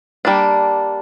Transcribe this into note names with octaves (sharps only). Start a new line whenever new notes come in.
G3 A#3 D4